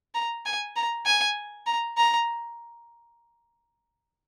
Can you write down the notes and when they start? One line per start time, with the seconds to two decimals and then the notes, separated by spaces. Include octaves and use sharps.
0.15 A#5
0.46 G#5
0.76 A#5
1.06 G#5
1.67 A#5
1.97 A#5